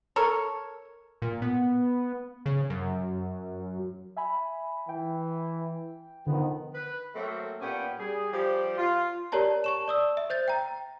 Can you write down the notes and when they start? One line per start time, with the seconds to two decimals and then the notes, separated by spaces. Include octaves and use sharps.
0.16 A4 A#4 C#5
1.22 A#2
1.42 B3
2.46 C#3
2.70 F#2
4.17 E5 G#5 B5
4.89 E3 G5
6.27 D3 D#3 F3 B3
6.74 B4
7.15 F#3 A3 A#3 C4 F#4
7.61 A#2 B3 C#4 G4 G5
7.98 G3 G#4
8.32 F3 G3 G4
8.77 F4
9.32 G4 A#4 C#5 D5 A5 A#5
9.64 A5 C#6 E7
9.88 D5 D#6 E6
10.17 E5
10.30 C5 G6 A6
10.48 G5 A#5